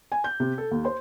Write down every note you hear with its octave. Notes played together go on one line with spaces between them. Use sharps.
G#5
G6
C3
A4
D#2
C5